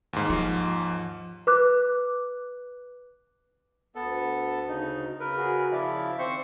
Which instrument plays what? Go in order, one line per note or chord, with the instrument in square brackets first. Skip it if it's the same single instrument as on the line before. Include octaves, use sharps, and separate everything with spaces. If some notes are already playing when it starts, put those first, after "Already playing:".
[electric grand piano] D#2 G#2
[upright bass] F3
[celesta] B4 D6 F#6
[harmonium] D2 [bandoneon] B3 A4
[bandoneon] C#3 D#4
C#3 A#4 B4
[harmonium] F#4 G#4
[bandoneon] C#3 F3 E4 [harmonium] D5 E5 F5
[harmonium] D#3 [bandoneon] C4 C5 C#6